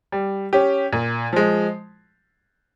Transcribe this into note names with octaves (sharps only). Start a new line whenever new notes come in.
G3
C#4 G4
A#2
F3 G#3